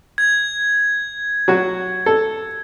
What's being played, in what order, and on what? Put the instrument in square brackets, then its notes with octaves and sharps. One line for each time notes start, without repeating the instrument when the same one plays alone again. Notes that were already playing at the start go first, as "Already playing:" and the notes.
[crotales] G#6
[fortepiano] F#3 F#4
A4